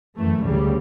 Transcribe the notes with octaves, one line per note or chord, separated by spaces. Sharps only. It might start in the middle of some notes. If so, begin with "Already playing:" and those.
F#2 E3 A3
D2 C#3 G3